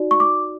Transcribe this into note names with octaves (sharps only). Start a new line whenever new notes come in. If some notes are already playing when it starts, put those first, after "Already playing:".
Already playing: D#4 F#4 D5
C#6
D6